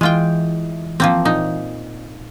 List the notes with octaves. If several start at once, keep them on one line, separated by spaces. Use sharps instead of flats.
E3 G#3 F4 G5
F3 A#3 C4
A#2 D#4